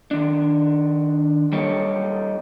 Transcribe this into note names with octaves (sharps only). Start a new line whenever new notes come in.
D#3 D4
G3 A#3 D#4 G4 A4 C#5